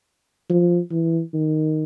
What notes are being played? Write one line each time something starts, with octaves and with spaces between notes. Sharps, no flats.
F3
E3
D#3